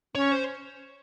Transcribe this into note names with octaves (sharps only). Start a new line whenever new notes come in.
C#4 C#5
C5